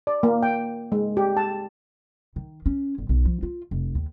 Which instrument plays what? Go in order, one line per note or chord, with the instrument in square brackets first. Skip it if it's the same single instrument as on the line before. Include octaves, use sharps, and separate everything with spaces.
[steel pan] D5
A#3
G5
G#3
G4
A5
[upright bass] D#3
C#4
G1
B1
F3
F4
F1
D#2